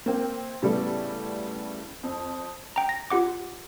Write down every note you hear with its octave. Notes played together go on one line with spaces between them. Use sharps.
A#3 C4 G5
A2 C#3 G3 B3 A4 D5
F2
G5 A#5
A#6
F4 G4 F#5 D6